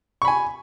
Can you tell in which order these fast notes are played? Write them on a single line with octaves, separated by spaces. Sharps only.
C#6 B5 G#5